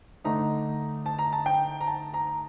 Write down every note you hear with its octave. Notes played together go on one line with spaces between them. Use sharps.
D3 A3 D#4 A#5
A5
A#5
A5
G5
A#5
A5
A#5